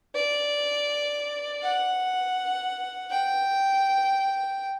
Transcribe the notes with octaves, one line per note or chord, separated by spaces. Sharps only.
D5
F#5
G5